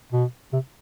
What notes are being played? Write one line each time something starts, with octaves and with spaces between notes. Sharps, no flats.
B2
C3